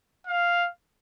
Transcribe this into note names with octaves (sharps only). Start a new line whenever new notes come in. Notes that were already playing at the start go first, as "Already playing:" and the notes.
F5